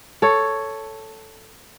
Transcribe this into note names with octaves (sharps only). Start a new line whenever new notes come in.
A4 C#5